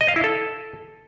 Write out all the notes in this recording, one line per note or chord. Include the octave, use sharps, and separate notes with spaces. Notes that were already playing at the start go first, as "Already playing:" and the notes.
D#5
F5
E4
A4